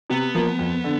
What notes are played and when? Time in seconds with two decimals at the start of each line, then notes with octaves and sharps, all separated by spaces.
0.10 C3 B3
0.35 F3 A#3
0.59 F2
0.84 D3